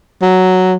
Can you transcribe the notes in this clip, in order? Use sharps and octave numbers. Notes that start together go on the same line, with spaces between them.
F#3